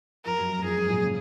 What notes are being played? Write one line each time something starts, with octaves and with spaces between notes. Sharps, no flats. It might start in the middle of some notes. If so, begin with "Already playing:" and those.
F2 A#4
F#2
F#2
F2 G#4
G#2
A#2
C#3